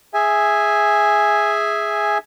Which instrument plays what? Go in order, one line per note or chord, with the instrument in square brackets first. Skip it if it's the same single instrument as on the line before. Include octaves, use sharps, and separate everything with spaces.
[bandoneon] G#4 E5 G#5